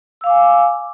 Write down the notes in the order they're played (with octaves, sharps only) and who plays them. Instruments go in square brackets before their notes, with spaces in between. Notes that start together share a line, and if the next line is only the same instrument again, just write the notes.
[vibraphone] E6
F5
D6
G#5